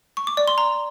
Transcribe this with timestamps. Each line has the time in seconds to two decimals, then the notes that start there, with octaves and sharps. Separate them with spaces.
0.17 C#6
0.27 D6
0.37 D5
0.48 C6
0.58 A#5